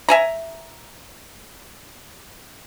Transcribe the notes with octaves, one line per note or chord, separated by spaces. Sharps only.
E5 G#5 A#5